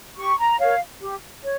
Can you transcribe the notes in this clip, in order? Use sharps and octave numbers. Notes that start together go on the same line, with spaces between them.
G4 C#6
A#5
A#4 C#5 F5
G4
C#5